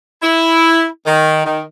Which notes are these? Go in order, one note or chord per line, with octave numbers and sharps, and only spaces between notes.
E4
D#3
D#3